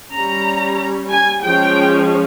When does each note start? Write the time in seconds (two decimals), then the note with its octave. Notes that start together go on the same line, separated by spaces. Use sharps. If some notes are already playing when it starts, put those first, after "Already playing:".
0.13 G3 C#4 A#5
1.11 G#5
1.43 F3 G#3 C#4 G5